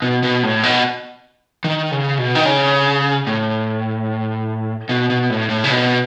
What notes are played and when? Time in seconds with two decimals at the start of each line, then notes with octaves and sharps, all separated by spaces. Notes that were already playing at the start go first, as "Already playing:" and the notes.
0.02 B2
0.23 B2
0.43 A2
0.63 B2
1.64 D#3
1.91 C#3
2.18 B2
2.35 D#3
2.46 C#3
3.27 A2
4.89 B2
5.10 B2
5.30 A2
5.50 A2
5.64 C#3
5.71 B2